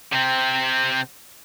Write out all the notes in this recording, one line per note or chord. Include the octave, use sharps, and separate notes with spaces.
C3 C4